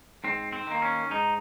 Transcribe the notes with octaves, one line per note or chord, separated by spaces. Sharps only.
G#2 C4
C4
D#3 A#3
C#4
G#2 D#4